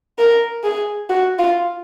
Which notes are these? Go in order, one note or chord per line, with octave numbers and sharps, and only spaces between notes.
A#4
G#4
F#4
F4